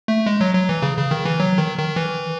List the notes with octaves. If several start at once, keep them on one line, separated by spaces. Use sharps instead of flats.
A3
G#3
F#3
F#3
E3
C#3
C#3
D#3
E3
F#3
D#3
D#3
E3